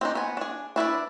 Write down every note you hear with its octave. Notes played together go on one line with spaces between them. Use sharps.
C4 D4 D#4
B3 G#5
D4 G#4
D4 E4 B4 D5